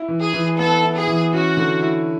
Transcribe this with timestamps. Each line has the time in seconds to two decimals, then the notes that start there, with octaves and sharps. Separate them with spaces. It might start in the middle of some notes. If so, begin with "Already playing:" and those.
Already playing: E4
0.08 E3
0.22 G#4
0.33 E3
0.58 B3 A4
0.83 E4
0.95 G#4
1.07 E3
1.33 C#4 F#4
1.57 D3
1.82 E4